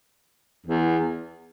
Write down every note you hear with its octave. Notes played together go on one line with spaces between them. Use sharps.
E2